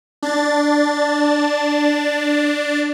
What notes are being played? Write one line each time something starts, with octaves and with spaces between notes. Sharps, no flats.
D4 A6